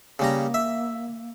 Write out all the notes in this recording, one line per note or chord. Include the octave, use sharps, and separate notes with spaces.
C#3 G3 A#3 A#5
E5